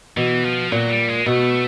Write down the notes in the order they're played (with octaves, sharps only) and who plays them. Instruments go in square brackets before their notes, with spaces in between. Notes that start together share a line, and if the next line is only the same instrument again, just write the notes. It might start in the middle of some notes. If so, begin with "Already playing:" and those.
[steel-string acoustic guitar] B2 [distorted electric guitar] E3
[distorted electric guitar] F3
[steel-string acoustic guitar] A#2 [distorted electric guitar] F#3
[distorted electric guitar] G3
G#3
[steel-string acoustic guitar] B2 [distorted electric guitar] A3